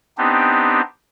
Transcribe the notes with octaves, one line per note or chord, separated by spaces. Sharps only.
B3 C4 D4 D#4 G4